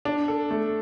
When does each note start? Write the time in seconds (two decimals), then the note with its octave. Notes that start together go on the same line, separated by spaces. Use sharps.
0.05 D4
0.28 A4
0.51 A3